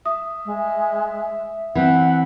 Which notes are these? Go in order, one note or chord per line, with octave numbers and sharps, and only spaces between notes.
E5 D#6
G#3
E3 C4 F#5